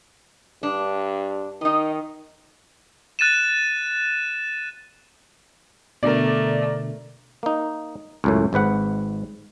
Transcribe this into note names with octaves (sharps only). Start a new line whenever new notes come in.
G2 D4
D#3 D#4 D#5
F#6 A6 D#7 E7
B2 D3 A3 A#4 D5
A#3 D#4
C#2 F#2 A2
G#1 G#2 B4 F#5